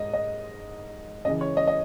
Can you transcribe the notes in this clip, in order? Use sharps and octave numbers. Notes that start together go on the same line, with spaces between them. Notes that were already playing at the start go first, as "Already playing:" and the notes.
Already playing: G#2 D#5
D#5
C#2 C#3 E3 D#5
C#5
D#5
D#5